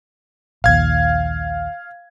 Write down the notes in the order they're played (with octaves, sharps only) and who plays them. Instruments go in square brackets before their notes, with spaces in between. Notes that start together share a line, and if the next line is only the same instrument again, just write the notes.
[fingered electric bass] A#1 D#2 [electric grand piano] F5 G#6